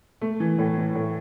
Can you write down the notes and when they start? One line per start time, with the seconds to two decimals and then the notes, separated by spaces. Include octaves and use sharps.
0.21 A3
0.40 E3
0.59 A2
0.77 E3
0.95 A2